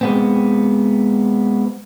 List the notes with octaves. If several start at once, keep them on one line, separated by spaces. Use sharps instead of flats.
G#3 B3 C4